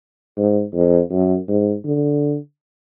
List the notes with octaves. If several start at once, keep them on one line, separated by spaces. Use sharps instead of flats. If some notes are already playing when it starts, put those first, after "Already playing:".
G#2
F2
F#2
G#2
D3